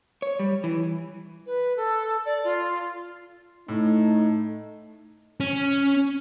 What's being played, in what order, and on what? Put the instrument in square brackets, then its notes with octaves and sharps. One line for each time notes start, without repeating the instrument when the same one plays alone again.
[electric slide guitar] C#5
G3
E3
[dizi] B4
A4
D5
F4
[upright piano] A2 [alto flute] A3 [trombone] D#4
[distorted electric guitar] C#4